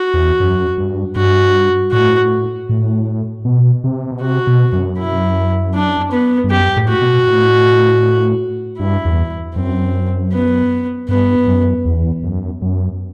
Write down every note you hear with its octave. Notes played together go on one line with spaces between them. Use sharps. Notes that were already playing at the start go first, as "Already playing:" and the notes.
Already playing: F#4
E2
F#2
G2
G2 F#4
A2 F#4
A2
B2
C3
B2
C3 F#4
B2
F#2
E4
D4
B3
G2
F#2 G4
A2
F#4
B2
A2
G2 E4
E2
F#2 C4
B3
G2 B3
F#2
E2
F#2
F#2